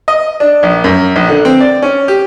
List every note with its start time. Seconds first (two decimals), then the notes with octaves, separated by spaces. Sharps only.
0.08 D#5
0.40 D4
0.63 A#1
0.84 F#2
1.16 A#1
1.29 D3
1.45 C4
1.60 D5
1.82 C#4
2.08 G4